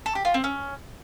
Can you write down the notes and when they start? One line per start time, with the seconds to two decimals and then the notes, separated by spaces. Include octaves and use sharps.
0.06 A4
0.15 G4
0.25 F4
0.34 C4
0.44 C#4